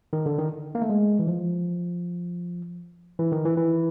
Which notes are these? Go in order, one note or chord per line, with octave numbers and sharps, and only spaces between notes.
D#3
D3
D#3
A#3
A3
G#3
E3
F3
E3
D#3
E3
E3